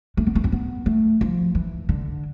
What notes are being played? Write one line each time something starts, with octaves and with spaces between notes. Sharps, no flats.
A3
B3
A3
C4
B3
A3
F3
E3
D3